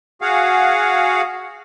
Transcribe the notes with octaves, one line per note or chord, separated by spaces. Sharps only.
F#4 G#4 F5 F#5